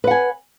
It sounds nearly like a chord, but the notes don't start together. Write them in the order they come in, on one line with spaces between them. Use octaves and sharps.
B4 F#5 G#5